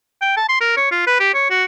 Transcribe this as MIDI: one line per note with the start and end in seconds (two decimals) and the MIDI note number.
0.22 0.34 79
0.37 0.44 81
0.49 0.57 84
0.61 0.76 70
0.77 0.87 73
0.91 1.06 65
1.07 1.18 71
1.20 1.32 67
1.34 1.49 73
1.50 1.64 66